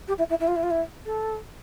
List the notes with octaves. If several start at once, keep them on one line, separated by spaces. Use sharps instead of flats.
G4
E4
E4
E4
F4
E4
F4
E4
A4